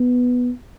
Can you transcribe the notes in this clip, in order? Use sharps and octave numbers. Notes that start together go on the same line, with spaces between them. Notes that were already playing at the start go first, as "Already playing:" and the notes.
Already playing: B3